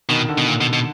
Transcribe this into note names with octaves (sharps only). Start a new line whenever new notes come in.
B2 D#3
D3
B2
A#2
B2
B2